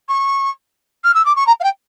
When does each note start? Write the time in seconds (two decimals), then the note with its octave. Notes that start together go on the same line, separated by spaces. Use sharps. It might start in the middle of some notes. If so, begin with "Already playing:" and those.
0.08 C#6
1.04 F6
1.14 E6
1.25 D6
1.35 C#6
1.47 A#5
1.60 F5
1.63 G5